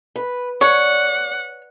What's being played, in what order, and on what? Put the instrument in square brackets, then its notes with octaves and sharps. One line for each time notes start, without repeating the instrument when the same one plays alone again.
[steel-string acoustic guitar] B4
[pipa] C#5 [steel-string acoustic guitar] D5 [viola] F#5